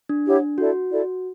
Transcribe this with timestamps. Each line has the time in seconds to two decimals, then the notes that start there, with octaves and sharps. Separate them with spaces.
0.09 D4
0.25 E4 G4 C#5 F#5
0.58 E4 F#4 A4 D5
0.90 E4 A4 D5